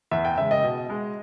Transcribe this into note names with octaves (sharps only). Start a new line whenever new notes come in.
E2 E5
G5
C#3 G#3 E5
D#5
B2
G#3